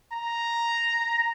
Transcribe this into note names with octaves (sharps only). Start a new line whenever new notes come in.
A#5